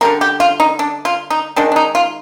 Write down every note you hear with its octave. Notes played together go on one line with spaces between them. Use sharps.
D3 G3 A#3 A#4
G4
F4
D#4
D4
F4
D#4
D#3 G#3 D4
D4
D#4
F4